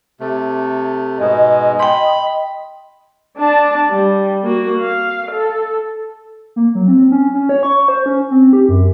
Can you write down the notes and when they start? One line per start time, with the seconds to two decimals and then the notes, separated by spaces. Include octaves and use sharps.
0.20 C3 A3
1.20 G#2 B2 G#3 D#5
1.79 G5 B5 C6
3.37 D4 A5
3.90 G3
4.43 A#3 F#4
4.81 F5
5.31 A4
6.56 A#3
6.75 F#3
6.88 C4
7.11 C#4
7.34 C#4
7.49 C#5
7.63 C#6
7.88 C5
8.06 C#4
8.31 C4
8.53 G4
8.69 F#2